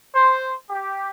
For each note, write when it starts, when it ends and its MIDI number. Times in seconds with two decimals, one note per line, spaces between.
0.15 0.52 72
0.69 1.10 67